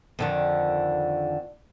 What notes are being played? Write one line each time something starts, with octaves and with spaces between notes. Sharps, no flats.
F2 D3 D#3